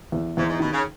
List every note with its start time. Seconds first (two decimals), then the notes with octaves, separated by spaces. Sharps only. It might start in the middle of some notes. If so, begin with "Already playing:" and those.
0.12 E2
0.37 E2 G#2
0.49 G#2
0.60 B2 D#3
0.72 C#3